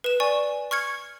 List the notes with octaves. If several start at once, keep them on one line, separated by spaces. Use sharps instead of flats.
B4 E7
D5 G#5 C#6
C#6 F6 G#6 C#7